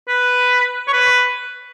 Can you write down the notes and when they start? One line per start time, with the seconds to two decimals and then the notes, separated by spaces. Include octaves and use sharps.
0.08 B4
0.87 C#5
0.93 B4